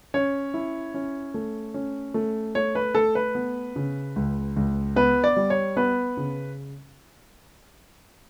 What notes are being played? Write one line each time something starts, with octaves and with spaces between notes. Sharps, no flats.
C#4 C#5
E4
C#4
A3
C#4
A3
A3 C#5
B4
A3 A4
B4
B3
C#3
C#2
C#2
B3 B4
D5
G3
C#5
B3 B4
C#3